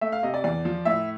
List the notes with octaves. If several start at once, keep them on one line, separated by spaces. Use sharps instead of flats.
A3 E5
F5
C3 D#5
D5
E2 D5
F3
A2 E5